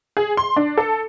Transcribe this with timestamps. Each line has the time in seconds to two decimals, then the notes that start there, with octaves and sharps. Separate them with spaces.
0.17 G#4
0.37 C6
0.56 D4
0.77 A4